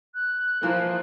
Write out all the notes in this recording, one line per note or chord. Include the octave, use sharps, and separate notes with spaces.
F#6
E3 F3 A#3